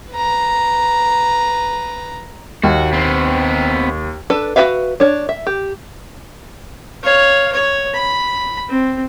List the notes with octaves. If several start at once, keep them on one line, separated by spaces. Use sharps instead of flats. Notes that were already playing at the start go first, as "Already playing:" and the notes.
B4 A#5
D#2 F#4
B3 C4
D4 A4 B4
F#4 G#4 B4 E5 F5
D4 C#5
E5
G4
C#5 F5
C#5
B5
C4